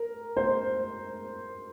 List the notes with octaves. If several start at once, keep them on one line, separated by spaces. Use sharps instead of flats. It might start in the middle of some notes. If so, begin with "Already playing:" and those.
Already playing: A#4
C5